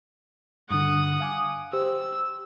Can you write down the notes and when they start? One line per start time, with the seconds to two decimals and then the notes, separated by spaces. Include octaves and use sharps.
0.71 G2 D3 F#5 D#6
1.20 F5 G#5 D6
1.73 G4 C5 E6